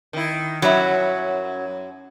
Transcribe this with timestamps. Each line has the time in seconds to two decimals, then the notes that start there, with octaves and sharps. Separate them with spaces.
0.13 D#3 E4
0.62 F#2 F#3 G3 E4